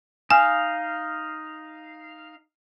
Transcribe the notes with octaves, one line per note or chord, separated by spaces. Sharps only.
D#4 F5 G#5